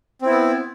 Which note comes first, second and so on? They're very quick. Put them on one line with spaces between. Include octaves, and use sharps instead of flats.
C4 E4 B3